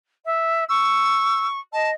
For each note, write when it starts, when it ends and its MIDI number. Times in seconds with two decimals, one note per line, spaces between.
0.25 0.64 76
0.69 1.59 85
0.69 1.46 88
1.73 1.93 75
1.73 1.90 81